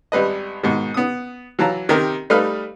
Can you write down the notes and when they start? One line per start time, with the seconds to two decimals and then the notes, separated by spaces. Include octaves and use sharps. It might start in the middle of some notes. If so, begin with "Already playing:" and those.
0.12 G#1 G3 B4 D#5
0.63 G#2 B2 D#3
0.94 B3 D#6
1.59 E3 F#3 F5 A5 A#5
1.89 C3 D#3 C4 G4 A#4
2.30 G3 A3 D#4 B4 F5 F6